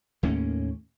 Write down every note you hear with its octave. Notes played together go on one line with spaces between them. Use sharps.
D#2 A2 A#3 C#4